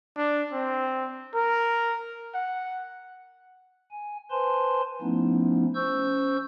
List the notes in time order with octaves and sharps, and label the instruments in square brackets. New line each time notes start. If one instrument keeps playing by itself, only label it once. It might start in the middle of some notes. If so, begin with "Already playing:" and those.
[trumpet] D4
C4
A#4
F#5
[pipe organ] G#5
B4 C5 G#5 A5 C6
F3 A3 B3 C#4 D#4 E4
C#4 C5 C#6 E6 G6